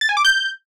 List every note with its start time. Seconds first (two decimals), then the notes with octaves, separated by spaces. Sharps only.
0.01 A6
0.09 G#5
0.17 D6
0.25 G6